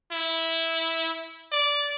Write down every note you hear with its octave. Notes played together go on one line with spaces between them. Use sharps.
E4
D5